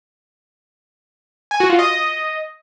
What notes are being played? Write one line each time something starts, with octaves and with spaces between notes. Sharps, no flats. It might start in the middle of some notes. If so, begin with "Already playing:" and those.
G#5
F#4
F4
D#5